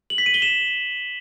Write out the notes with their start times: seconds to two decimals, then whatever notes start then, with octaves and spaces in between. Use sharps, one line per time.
0.10 F#7
0.18 B6
0.26 D#7
0.34 G7
0.42 E7